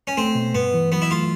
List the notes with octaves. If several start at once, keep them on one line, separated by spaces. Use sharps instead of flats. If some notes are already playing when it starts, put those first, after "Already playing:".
C#4
A3 C4
B2
G2 B3
E3
F#3 B3
E4
A3 F4